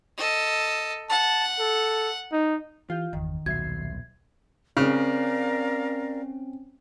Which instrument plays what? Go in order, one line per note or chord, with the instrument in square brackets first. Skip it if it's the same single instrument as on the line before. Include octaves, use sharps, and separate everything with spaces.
[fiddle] A4 D#5
[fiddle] F#5 [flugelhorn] A5
[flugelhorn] A4
D#4
[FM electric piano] E3 G4 G6 [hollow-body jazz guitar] F4 F5
[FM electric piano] G1 E2 [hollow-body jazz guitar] D#3
[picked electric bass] D#1 B1 [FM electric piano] F#4 E5 C7 [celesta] G#6
[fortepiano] C#3 [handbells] C4 C#4 [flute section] A#4 D5 F5